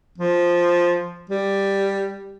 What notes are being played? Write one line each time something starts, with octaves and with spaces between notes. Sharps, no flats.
F3
G3